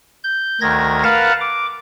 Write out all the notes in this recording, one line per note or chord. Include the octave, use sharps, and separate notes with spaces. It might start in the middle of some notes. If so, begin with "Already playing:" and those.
G6
D2 D#3 G#6 A#6
A#4 B4 F5 F#5 A5
D6